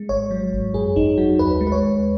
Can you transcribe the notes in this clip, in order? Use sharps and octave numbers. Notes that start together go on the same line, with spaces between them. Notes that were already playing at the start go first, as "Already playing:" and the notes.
Already playing: G#3
G#1 C#5
F#3
G#1
F#2 G#4
G#1 D#4
F#3 F#4
D#2 B4
G#3
B4
C#5
D#2